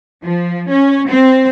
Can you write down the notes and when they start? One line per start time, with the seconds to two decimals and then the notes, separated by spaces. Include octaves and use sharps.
0.24 F3
0.70 C#4
1.09 C4